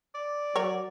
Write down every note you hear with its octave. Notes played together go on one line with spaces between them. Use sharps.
D5
F#3 A#4 C#5